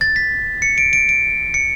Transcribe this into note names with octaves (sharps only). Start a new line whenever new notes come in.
A6
B6
C#7
D7
D7
D7
C#7